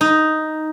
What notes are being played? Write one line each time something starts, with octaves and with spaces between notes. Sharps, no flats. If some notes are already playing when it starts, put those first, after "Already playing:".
D#4